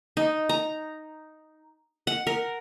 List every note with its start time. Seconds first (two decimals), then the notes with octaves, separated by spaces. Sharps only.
0.17 D#4
0.49 A#5
2.07 F#5
2.27 A#4